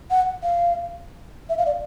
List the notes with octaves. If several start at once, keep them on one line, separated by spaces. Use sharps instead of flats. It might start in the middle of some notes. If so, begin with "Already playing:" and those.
F#5
F5
E5
F5
D5